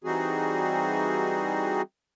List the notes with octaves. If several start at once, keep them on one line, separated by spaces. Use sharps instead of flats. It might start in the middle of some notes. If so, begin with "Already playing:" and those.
E3 G3 C4 D#4 F#4 G#4